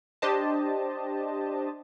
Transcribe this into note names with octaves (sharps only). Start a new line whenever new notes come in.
D4 G4 C5 D#5 A5